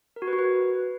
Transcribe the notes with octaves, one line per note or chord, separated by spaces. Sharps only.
A#4
F#4
B4
F#4
B4